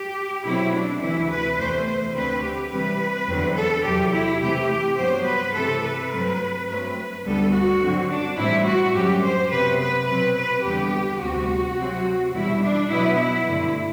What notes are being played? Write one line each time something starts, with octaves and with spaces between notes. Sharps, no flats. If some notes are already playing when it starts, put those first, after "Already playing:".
Already playing: G4
B2 F#3 A3 C4 E4
D4
D2 C3 E3 E4
B4
E2 C3 E3 A3 C5
C5
D2 D3 A3 C4 B4
G4
C3 E3 G3 B4
E2 D3 F#3 C4
A4
E2 C3 F#3 G4
E4
C3 E3 A3 G4
G2 F#3 B3 C5
B4
C3 E3 A3 C4 A4
B4
G2 F#3 A3 C4
G2 F#3 A3 C4 B4
D2 D3 G3 B3 A4
F#4
G2 D3 F#3 C4
D4
A2 E3 G3 C4 E4
F#4
F#2 D3 G3 G4
C5
C3 F#3 B3 B4
B4
B2 F#3 C4 B4
B4
E2 D3 G3 B3 G4
D2 C3 G3 B3 F#4
C3 F#3 C4
E2 B2 G3 E4
D4
B2 F#3 B3 E4
E4
G2 D3 A3